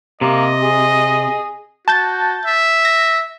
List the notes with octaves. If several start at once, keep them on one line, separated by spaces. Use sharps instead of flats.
C3 A#3 D#5
G#4
F#4 A5 G6 A6
E5
A#6